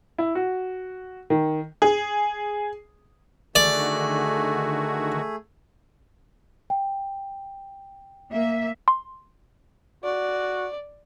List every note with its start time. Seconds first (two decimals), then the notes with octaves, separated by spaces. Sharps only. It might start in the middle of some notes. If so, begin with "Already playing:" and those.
0.18 E4
0.35 F#4
1.30 D#3
1.82 G#4
3.55 D3 D#3 A3 F#4 G#4 D5
6.70 G5
8.31 A#3 E5
8.88 C6
10.04 F#4 D5